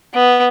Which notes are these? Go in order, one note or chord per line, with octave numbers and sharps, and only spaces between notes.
B3